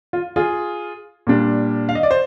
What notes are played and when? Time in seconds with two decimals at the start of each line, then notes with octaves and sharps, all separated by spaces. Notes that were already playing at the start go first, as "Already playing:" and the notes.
0.13 F4
0.36 F4 G#4
1.27 A#2 G3 D4
1.89 F5
1.95 D#5
2.03 D5
2.11 C5